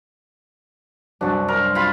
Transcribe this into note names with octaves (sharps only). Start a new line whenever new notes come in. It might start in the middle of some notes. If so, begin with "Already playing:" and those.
C2 F#2 D4 F#4
A#4
C6
F4 B5